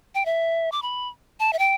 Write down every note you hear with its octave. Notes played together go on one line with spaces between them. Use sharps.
G5
E5
D6
B5
A5
E5
G5